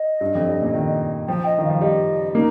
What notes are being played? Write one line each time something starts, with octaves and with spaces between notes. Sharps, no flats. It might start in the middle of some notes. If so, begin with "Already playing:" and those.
Already playing: D#5
G2
F2
G2
A#2
D#3
F3 G5
D#5
D#3
F5
F3
G3 D#5
A#3 D#4